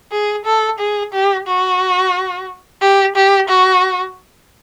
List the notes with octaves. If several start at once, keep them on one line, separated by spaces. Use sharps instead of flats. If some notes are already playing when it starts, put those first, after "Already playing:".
G#4
A4
G#4
G4
F#4
G4
G4
F#4